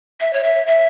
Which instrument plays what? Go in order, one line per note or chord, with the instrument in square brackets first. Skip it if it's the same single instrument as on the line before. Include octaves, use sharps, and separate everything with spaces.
[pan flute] E5
C#5
E5
E5